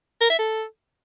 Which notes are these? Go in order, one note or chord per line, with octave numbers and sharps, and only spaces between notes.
A#4
E5
A4